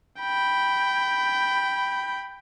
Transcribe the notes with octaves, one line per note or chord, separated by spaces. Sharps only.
G5 B5